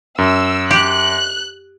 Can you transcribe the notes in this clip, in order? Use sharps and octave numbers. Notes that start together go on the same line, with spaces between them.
F#2 E6
G4 F#6